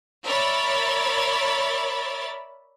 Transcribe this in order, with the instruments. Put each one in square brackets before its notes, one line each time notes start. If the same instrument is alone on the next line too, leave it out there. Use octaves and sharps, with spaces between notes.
[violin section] A#4 C#5 D5 E5 B5 A6